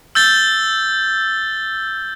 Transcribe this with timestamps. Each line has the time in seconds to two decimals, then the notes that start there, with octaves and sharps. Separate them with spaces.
0.15 E6 G6 A6 G7